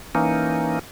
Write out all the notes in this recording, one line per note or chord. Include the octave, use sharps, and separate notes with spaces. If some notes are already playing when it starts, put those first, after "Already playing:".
E3 A#3 C#4 D#4